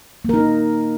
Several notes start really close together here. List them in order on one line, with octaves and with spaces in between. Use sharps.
A#3 A#4 D#4